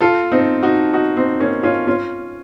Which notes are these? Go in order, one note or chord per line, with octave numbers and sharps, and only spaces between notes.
F4 A4
C4 D#4
D#4 F#4
D#4 F#4
C4 D#4
A#3 C#4
C#4 F4
C#4 F4